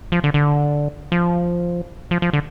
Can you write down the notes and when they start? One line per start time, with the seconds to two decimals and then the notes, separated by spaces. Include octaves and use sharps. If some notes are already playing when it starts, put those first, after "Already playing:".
0.12 F3
0.24 D3
0.34 D3
1.12 F3
2.11 F3
2.22 F3
2.33 D3